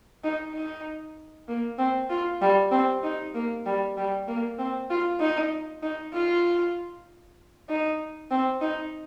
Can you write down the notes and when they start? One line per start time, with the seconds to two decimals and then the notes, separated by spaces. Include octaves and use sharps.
0.24 D#4
0.54 D#4
1.48 A#3
1.79 C4
2.10 F4
2.42 G3
2.72 C4
3.03 D#4
3.35 A#3
3.66 G3
3.97 G3
4.28 A#3
4.59 C4
4.90 F4
5.20 D#4
5.82 D#4
6.14 F4
7.69 D#4
8.31 C4
8.61 D#4